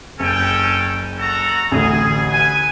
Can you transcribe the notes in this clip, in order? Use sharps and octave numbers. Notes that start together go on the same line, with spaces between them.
F#1 C#4 A4 G5
F#4 A4 A#5
A1 D2 G#4
B4 G#5